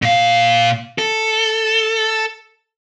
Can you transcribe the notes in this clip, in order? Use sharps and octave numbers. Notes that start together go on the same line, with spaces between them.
A#2 F5
A4